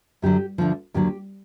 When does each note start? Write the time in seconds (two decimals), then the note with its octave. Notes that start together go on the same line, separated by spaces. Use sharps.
0.22 F#2 D3 F#3 G4
0.58 D2 D3 F3
0.94 D#2 D3 F#3 G4